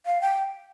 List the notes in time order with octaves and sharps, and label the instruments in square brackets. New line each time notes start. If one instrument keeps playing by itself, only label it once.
[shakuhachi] F5
G5